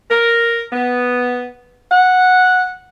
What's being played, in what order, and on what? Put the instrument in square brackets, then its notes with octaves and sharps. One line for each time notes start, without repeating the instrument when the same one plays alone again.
[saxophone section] A#4
B3
F#5